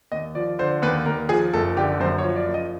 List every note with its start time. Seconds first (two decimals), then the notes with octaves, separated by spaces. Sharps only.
0.12 D#2 D#5
0.35 F3 D5
0.59 D3 C5
0.82 D#2 B4
1.06 D#2 A#4
1.29 F3 G#4
1.53 F#1 A4
1.76 D3 G4
2.00 F#2 C5
2.18 C#5
2.24 F3
2.36 D5
2.48 F#1
2.54 D#5